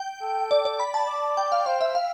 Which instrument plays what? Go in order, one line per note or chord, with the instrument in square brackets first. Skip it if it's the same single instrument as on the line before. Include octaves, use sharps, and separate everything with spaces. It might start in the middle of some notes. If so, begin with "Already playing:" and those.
Already playing: [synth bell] G5
[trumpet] A4
[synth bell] D5
D5
B5
A5
[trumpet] D5
[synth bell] G5
F5
[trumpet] C5 [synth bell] F5
[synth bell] E5
F5